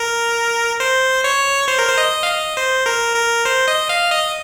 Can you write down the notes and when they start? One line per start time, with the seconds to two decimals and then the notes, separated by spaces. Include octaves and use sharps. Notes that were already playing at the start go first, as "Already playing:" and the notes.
Already playing: A#4
0.80 C5
1.24 C#5
1.68 C5
1.79 A#4
1.88 C5
1.98 D#5
2.23 F5
2.27 D#5
2.57 C5
2.86 A#4
3.16 A#4
3.45 C5
3.68 D#5
3.89 F5
4.11 D#5